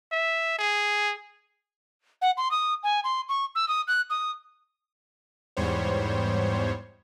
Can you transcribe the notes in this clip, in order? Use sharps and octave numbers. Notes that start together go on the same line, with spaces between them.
E5
G#4
F#5
C6
D#6
G#5
C6
C#6
E6
D#6
F#6
D#6
E2 G#2 G3 C5 C#5